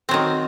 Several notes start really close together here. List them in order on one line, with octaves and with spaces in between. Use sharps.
C4 F#3 D#3